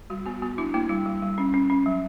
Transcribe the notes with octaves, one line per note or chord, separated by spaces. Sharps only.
G3 F#4
B3 F#4
B3 F#4
D4 E4
A#3 E4
G3 E4
G3
G3
C#4
C#4
C#4
F#3